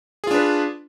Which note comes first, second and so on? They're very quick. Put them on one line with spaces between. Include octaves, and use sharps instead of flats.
G#4 F4 D4 B4